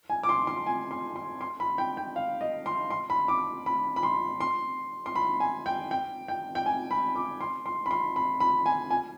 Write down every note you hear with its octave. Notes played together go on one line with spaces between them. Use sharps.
G#5
D6
C6
C6
G#5
C6
C6
C6
B5
G5
G5
F5
D#5
C6
C6
B5
D6
B5
B5
C6
C6
C6
B5
G#5
G5
G5
G5
G5
G#5
B5
D6
C6
C6
B5
C6
B5
B5
G#5
G#5